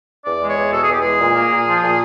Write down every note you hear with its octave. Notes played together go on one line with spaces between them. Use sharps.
E2 D5
G#3
C#5
E2
B2 A4
G#4
E2 G4
G#3 G#4
A#2
A#3
A#2
F3
A#2